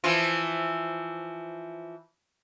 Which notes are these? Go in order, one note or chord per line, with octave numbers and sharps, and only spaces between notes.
E3 F3 F4